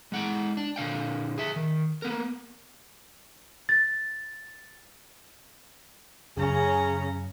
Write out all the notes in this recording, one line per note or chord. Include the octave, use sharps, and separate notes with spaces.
G#3 F#5 G5
D4
A#2 D3 F5 G5
G#4 E5
D#3
A#3 B3 A#4
A6
F#2 C#3 C#4 G#4 A#5